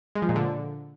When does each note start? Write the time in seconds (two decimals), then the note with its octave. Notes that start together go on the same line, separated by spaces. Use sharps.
0.15 G#3
0.22 F3
0.29 A#2
0.36 D3